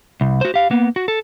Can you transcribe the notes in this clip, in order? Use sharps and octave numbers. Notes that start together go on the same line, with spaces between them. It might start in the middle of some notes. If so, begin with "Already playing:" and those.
C2
F#4 C5
G4 F5
A#3 B3
F#4
A4